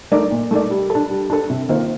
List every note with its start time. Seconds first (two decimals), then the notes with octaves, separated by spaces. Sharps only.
0.12 A3 D#4 A#4 D5
0.31 A#2
0.51 A3 D#4 A#4 D5
0.70 G3
0.90 A4
0.95 D4
1.10 G3
1.30 D4 A4
1.50 C3
1.69 D#3 A#3 F4 C5